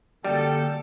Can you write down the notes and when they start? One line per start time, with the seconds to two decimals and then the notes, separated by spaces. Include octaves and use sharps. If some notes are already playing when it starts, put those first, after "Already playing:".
0.24 F#2 D3 G3 A#3 A4 G5